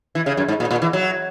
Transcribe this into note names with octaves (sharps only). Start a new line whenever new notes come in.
E3
C#3
F#2
G#2
A#2
A#2
E3
F#3